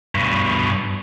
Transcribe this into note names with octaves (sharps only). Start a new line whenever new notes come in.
G2 B2